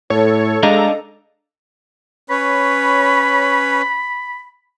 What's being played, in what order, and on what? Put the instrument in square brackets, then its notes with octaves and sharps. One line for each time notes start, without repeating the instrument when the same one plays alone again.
[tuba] A2 [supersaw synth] A4 [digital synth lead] C#5
[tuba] G#3 [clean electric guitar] D4 D#5 F5 [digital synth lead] A#5
[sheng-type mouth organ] C#4 B4 C#5 [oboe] B5